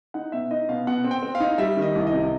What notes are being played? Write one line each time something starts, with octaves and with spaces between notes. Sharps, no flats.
D#4 F#5
B2 E5
D#4 D#5
B2 F5
B2 F#5
C4
G5
C4
F5
D#4
G3 E5
D#3
D#5
C2
D#5
C3